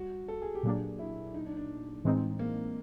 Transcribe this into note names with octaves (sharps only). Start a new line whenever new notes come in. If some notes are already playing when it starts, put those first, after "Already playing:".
Already playing: G3 F#4
A4
G#4
G4
A#2 F#3 A#3 D4 G#4
E4
D#4
D4
D4
A2 E3 G#3 C4 D#4
A#3